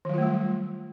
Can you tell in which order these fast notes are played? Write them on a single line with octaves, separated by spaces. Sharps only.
D#3 F#3 F4 A3 G3